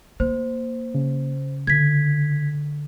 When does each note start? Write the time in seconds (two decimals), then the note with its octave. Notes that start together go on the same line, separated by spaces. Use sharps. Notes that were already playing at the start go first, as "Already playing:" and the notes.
0.20 A#3 C5
0.95 C#3
1.67 D3 G#6 B6